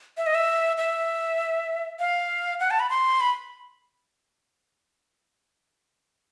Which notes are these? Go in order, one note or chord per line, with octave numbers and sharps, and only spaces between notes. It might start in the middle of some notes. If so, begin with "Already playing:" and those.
E5
D#5
E5
E5
F5
F#5
A5
B5
C6
B5